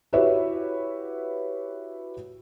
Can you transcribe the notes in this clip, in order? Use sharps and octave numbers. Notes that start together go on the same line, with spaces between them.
E4 F#4 G4 B4 C#5 E5